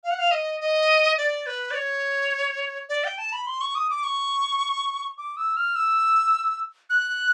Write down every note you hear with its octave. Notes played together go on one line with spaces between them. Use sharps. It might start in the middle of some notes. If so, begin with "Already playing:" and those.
F5
F#5
F5
D#5
D#5
D5
B4
D5
C#5
D5
G5
A5
B5
C6
C#6
D#6
D6
C#6
D6
E6
F6
E6
F#6